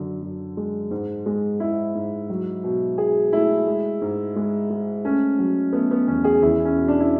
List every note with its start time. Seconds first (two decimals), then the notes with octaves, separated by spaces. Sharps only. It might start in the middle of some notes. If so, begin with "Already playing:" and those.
Already playing: F#2 D3
0.22 F#2
0.57 G#3
0.91 G#2
1.26 G#3
1.60 G#3 E4
1.95 G#2
2.30 F#3
2.64 B2
2.97 B2 G#4
3.32 A3 E4
3.67 G#3
4.02 G#2
4.36 G#3
4.70 G#3
5.05 A3 C#4
5.39 F#3
5.73 A3 B3
5.91 B3
6.07 E2 C#4
6.24 G#4
6.42 E2 E4
6.65 C#4
6.76 B2
6.88 D4
7.00 E4